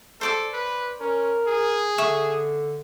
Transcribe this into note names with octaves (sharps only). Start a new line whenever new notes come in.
A4 C5 D5 D6
B4
C#4 A#4
G#4
D3 E5 C#6